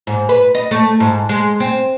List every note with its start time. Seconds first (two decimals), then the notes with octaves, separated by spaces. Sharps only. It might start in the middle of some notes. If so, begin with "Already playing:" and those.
0.07 G#2
0.29 B4
0.55 D#5
0.71 A3
1.00 G#2
1.29 G#3
1.60 C4